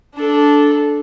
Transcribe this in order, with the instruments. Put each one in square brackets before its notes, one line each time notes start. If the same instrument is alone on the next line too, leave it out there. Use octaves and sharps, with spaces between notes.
[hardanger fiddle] D4 A4